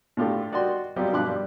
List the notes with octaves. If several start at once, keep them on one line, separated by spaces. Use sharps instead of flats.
A2 D3 F4 G4 A4
G3 F#4 D5 D#5 G5 C6
F#3 G3 C4 F4 G4 D#5
G2 B2 F3 C6 D6 F#6
G3